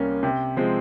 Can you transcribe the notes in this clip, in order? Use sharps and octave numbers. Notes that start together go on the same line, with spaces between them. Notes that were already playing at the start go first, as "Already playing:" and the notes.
Already playing: C2 A#3 C#4
C3
F3 G#3 C4